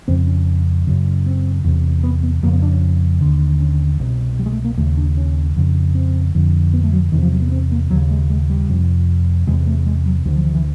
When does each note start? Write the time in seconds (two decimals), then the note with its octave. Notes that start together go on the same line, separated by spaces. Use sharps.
0.08 F2 C#3 C4
0.27 C#4
0.87 F#2 C#3
1.26 C4
1.64 E2 C3
2.03 B3
2.23 B3
2.43 F2 C#3 A#3
2.53 B3
2.62 D4
2.72 C#4
3.21 D#2 D3
3.60 C#4
4.00 C2 B2
4.39 G3
4.46 G#3
4.52 A3
4.64 A#3
4.77 D#2 C#3 A3
4.97 D4
5.17 C#4
5.56 F2 C#3
5.95 C4
6.34 F2 D3
6.74 B3
6.84 A3
6.93 F#3
7.12 E2 C3 D#3
7.22 F3
7.32 F#3
7.42 B3
7.52 C4
7.72 A#3
7.90 D#2 C#3 F#3
8.11 G#3
8.30 G#3
8.50 G3
8.69 F2 C3
9.47 E2 C3 G#3
9.67 A3
9.86 G#3
10.06 F#3
10.25 D2 E3
10.29 D3
10.36 F3
10.45 E3
10.55 E3